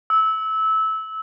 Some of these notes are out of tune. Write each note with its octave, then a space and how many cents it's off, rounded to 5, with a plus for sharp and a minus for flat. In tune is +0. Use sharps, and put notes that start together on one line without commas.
E6 -20